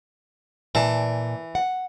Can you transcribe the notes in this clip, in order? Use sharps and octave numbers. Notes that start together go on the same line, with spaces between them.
A#2 E3 D5 A5
F#5